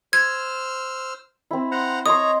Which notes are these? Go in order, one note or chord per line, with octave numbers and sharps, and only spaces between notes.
C5 E6 F6 G#6
C4 E4
C5 F#5 A#5
C#5 D#5 A#5 C6 D#6